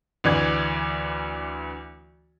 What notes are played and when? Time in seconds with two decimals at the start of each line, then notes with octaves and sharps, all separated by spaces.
0.24 D2 E3 D5 G#6